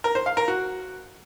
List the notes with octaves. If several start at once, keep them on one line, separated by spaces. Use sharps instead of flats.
A#4
C5
F5
A#4
F#4